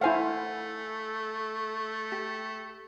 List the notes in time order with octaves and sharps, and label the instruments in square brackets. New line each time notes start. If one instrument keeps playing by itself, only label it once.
[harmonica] A3 [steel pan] E4 C5 F5 [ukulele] F#5 G#5
[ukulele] G4